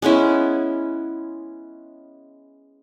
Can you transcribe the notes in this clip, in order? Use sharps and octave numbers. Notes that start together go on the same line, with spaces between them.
G#3 B3 C#4 E4